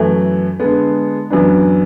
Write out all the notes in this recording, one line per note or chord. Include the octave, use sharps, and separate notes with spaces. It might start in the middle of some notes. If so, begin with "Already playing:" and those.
Already playing: F#2 E3 A3
D3 G#3 B3
F#2 E3 B3 D4